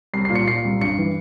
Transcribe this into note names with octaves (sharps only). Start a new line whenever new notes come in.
C2 C7
A#2 C7
C#7
A#2 C7
C2
G2 C#7
E3